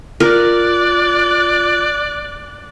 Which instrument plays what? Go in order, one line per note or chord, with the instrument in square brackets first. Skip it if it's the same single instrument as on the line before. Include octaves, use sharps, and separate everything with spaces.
[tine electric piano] F4 [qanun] A#4 [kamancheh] D5 F#6